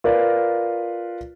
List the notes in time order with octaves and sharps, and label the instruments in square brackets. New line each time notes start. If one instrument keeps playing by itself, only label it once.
[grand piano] F4 A#4 B4 D5 F5